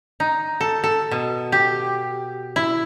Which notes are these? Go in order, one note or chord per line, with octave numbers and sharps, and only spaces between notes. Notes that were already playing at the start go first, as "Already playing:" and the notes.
D#4
A4
A4
B2
G4
E4